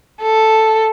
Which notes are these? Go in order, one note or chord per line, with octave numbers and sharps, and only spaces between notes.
A4